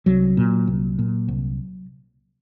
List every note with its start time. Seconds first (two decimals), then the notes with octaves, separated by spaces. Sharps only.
0.06 C2 F#3
0.37 A#2
0.67 C2
0.99 A#2
1.28 C2